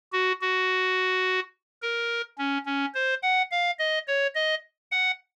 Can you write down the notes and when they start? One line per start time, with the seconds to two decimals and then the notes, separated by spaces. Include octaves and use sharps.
0.12 F#4
0.41 F#4
1.82 A#4
2.38 C#4
2.66 C#4
2.95 C5
3.23 F#5
3.51 F5
3.79 D#5
4.08 C#5
4.35 D#5
4.92 F#5